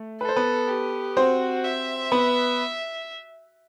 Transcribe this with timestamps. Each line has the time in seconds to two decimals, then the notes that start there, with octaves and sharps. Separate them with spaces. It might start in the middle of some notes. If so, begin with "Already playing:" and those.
Already playing: A3
0.21 A4 B4
0.29 C5
0.36 B3 B4
0.68 G4
1.17 C4 F#4 C5
1.64 E5
2.12 B3 B4